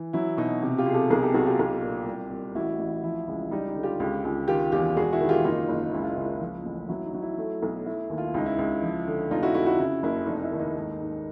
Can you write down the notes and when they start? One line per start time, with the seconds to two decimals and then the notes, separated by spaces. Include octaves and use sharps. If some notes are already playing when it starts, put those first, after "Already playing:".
Already playing: E3
0.13 F#3 E4
0.37 B2 D#4
0.62 C3
0.78 F4 G4
0.86 C3 G#4
0.94 G4 A4
1.10 B1 G#4 A#4
1.22 G4 A4
1.34 B1 F#4 G#4
1.46 F4 G4
1.59 B1
1.82 A#2
2.06 C2
2.31 C2
2.55 A1 E4 F#4
2.79 A1
3.03 F3 E4
3.28 C#2
3.51 G3 D#4
3.68 D#4
3.75 D3
3.83 F4 G4
4.00 C#2
4.24 C#2
4.48 D#3 F4 G4
4.72 E2 F4 G4
4.96 E1 F#4 G#4
5.13 E4 F#4
5.20 D#3
5.29 F4 G4
5.44 F#1 D#4 F4
5.69 F#1
5.93 C#2 E4
6.03 F4
6.15 C#2 E4
6.41 F3
6.65 A1
6.89 F#3 E4
7.05 D#4
7.14 F#3
7.22 E4
7.38 A3
7.62 B1
7.86 A3 E4
8.10 D#2
8.18 F4
8.28 E4
8.34 C#2 D#4
8.46 E4
8.58 C#2
8.83 F3
9.07 D3
9.31 F1 D#4 F4
9.43 E4 F#4
9.54 F1 E4 F#4
9.66 E4 F#4
9.79 C#3 E4
10.03 F#1 E4
10.27 F1 D#4
10.43 E4
10.52 D#2
10.60 D#4
10.76 G#2
11.00 G#2